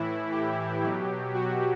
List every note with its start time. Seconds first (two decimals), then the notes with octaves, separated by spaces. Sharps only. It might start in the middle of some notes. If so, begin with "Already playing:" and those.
Already playing: A2 E3 E4
0.32 G4
0.83 B2 F#3
1.35 F#4